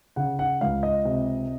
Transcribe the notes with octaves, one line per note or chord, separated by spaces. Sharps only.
C#3 F#5
F#5
C#2 F5
D#5
C3